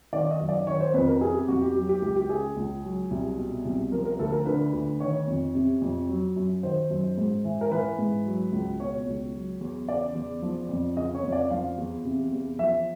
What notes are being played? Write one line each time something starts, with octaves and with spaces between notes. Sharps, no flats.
D#3 D5
D#5
F#2
D5
D#3 C#5
C5
F2 B4
A#4
C3 G#4
G4
F2 F#4
G4
F#3 G4
G4
C#2 G4
G4
C#3 G#4
C#2
F#3
C2
B2
C2
F3 A#4
A#4
D2 A4
A#4
D3 B4
D2
D#3 C#5
F2
C3
F2
F#3
F#2
D#3 C5
F#2
G#2
E3
A#4
E3 B4
G#2
F#3
C#2
B2 C#5
C#2
F#3
E2
C#3 D5
E2
F3
F2
C#3 D#5
C#5
F2
D5
F3 F5
E2
C3
E2
F3 E5